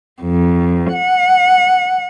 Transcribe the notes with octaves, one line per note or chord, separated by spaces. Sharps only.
F2
F#5